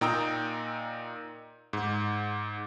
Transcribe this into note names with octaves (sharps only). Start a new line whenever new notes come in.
A#2 D#4 G5 A#5 D#6 E6
G#2